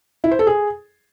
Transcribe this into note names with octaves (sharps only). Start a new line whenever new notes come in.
E4
C5
A4
G#4